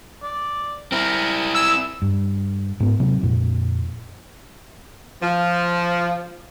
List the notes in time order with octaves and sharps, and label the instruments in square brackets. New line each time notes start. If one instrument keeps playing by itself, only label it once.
[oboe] D5
[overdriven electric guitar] C4 E4 [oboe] A#4
[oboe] G#5 [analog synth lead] E6
[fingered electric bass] G2
G#2 B3
C3 F#3
F2 A#2
[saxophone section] F3